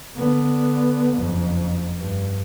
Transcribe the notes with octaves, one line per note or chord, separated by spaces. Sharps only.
D3 B3
F#1 F2
G2